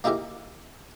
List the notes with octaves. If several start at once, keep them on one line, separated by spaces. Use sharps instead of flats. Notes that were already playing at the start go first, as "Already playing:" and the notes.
A#3 D#4 E4 G4 G#4 A#4